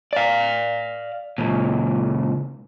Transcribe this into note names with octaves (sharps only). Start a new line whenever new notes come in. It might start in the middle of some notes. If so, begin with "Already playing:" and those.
D5 F5
C#2 A#2